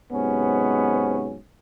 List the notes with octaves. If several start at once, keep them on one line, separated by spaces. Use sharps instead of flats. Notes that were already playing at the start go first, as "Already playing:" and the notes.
G#2 C3 F#3 B3 C#4